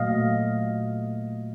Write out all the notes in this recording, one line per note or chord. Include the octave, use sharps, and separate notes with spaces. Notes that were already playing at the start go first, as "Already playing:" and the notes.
Already playing: A#2 F#3 A3 D#5 F5